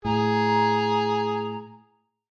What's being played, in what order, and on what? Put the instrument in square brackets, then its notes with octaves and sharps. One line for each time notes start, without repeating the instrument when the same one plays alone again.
[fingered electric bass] A2 [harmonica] G#4 [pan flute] A#5